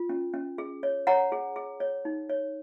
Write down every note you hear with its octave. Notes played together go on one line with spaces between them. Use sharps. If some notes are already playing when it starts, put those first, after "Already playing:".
Already playing: F4
C#4
C#4
G#4
C#5
C#5 F#5 A#5
G#4
G#4
C#5
D#4
C#5